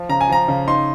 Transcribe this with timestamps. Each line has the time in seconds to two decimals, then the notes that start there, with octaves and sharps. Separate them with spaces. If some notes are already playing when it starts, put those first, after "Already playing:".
Already playing: F3
0.09 C#3 A#5
0.21 G#5
0.29 F3 A#5
0.48 C#3
0.68 D#4 C6